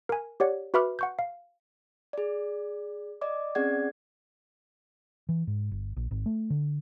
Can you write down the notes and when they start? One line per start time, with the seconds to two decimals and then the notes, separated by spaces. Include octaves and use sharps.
0.09 A#4 G#5
0.40 G4 C#5 D5 F#5
0.74 F#4 B4 E5 B5 D6 F6
0.99 F#5 C#6 G6
1.19 F5
2.13 G#4 D5
3.21 D5 D#5 D6
3.55 C4 C#4 G#4 D5 F#5 G#6
5.29 E3
5.47 G#2
5.72 G1
5.97 A#1
6.11 G#1
6.26 A3
6.50 D3